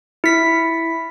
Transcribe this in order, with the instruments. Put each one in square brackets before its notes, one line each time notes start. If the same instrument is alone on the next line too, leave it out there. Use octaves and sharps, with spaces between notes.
[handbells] E4 B6